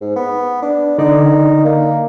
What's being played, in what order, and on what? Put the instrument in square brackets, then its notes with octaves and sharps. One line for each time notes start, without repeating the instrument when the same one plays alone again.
[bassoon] G#2
B3
D4
[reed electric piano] D3 D5 [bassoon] D#4
[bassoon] A#3